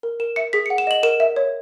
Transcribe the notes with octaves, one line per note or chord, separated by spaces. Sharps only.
A#4
A#4 E7
E5 C#7
G#4 B6
C#7
F#5
E7
D#5 F#7
A#4 E7
E5
C#5